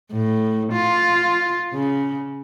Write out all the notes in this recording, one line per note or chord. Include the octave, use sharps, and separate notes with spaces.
A2
F4
C#3